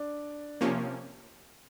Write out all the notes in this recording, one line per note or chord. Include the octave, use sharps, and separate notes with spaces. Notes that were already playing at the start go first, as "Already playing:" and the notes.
Already playing: D4
C3 F3 A#3 C#4